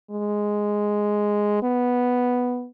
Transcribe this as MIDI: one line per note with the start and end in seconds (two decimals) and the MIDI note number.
0.11 1.61 56
1.63 2.67 59